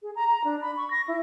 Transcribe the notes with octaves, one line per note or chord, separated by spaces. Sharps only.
G#4
A#5
A#5
D4
B5
C#6
A#6
E4